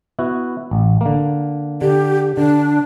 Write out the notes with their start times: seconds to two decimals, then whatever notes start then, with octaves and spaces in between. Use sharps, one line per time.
0.19 B3 E4 F#4
0.71 A1
1.01 D3 A#3
1.81 D3 G4
2.37 D3 D4